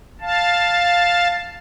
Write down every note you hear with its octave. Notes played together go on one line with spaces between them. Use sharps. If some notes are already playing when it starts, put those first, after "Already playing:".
F5 A5